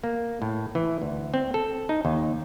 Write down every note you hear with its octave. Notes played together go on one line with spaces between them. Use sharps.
A#3
A2
E3
D2
C4
A4
D#4
D#2